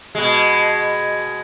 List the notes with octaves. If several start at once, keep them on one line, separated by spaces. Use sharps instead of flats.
B2 G#3